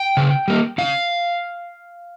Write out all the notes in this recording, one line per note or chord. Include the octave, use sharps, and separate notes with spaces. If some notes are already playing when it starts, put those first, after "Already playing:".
Already playing: G5
C#3
G3 A#3
C#3 F5